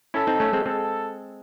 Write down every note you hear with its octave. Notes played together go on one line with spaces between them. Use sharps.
C#4 E4 A4
C4 D#4
A3 C#4
G#3 C4
G#3 C4 A4